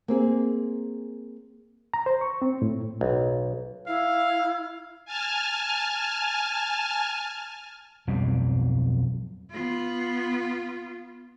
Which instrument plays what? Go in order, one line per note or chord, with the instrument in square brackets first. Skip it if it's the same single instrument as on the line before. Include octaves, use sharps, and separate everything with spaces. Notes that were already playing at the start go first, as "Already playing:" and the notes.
[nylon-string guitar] A#3 C4 G#4
[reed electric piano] A#5
C5
C#6
C4
A2
[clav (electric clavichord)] B1
[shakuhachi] E4 [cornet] F5
[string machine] G#5 A5 F6
[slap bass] B1 F2 G#2 G3
[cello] B3 F4